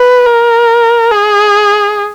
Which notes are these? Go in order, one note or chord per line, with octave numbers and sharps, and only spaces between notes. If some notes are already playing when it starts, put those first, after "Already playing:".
Already playing: B4
A#4
G#4